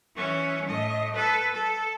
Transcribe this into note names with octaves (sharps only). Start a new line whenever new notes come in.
E3 C#4
A2 D#5
A4 B4
A4